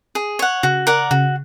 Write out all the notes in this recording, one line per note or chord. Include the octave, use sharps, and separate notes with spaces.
G#4
C#5 F#5
C#3 F#4
A#4 D5 F#5
C#3 F#4